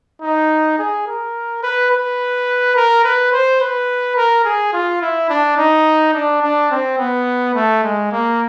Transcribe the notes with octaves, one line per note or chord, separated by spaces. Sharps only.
D#4
G#4
A#4
B4
B4
A#4
B4
C5
B4
A#4
G#4
F4
E4
D4
D#4
D4
D4
C4
B3
A3
G#3
A#3